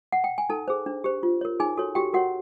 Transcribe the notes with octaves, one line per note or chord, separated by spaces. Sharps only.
F#5
G5
G#5
D#4 A4 A5
G#4 C5
D4
G4 C5
F4
A#4 C#5
D#4 G#4 G#5
F#4 A4 C#5
F#4 G4 G5
F#4 A#4 C#5 F#5